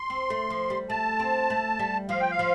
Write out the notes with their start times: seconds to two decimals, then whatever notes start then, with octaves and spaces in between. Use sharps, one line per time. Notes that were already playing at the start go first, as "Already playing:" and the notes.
Already playing: C6
0.10 C4
0.30 A3
0.50 F3
0.70 G3
0.90 A3 A5
1.20 C4
1.50 A3
1.79 G3
2.09 F3 F5
2.20 G5
2.31 F5
2.39 F3